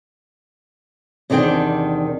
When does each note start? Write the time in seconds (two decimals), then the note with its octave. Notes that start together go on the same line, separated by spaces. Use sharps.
1.30 E2 C3 D#3 D4 G#4 G5